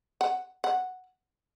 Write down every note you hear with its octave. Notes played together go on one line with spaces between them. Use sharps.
F#5
F#5